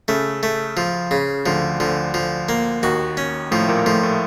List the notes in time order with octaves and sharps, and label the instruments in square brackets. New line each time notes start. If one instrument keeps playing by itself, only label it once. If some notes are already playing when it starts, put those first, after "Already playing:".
[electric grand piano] C#3 [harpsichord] A3
[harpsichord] A3
F3
C#3
[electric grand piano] D2 D3 [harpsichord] F3
[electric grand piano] D2 D3 [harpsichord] F3
[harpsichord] F3
A#3
[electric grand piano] D#2 D#3 [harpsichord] F#4
[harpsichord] C#4
[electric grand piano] A2 A3 [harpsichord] F3
[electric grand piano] A#2 A#3
[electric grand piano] A2 A3 [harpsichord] F3
[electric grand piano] A2 A3